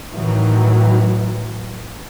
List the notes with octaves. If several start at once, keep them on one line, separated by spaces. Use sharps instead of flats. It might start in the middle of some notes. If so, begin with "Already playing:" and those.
A2 D#3 E3 F#3